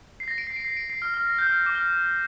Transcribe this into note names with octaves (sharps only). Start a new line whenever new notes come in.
C7
A#6
D7
C7
D7
C7
D7
C7
F6
F6
A#6
G6
F6
D6
F6